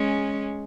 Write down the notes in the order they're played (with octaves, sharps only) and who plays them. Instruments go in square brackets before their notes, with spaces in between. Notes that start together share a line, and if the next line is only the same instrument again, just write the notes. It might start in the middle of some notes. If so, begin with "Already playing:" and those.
Already playing: [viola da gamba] G#3 C#4